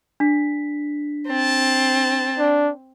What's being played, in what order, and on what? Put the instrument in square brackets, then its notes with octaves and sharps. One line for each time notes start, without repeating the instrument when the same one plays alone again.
[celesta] D4 B6
[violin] C4 [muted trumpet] A5
[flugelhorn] D4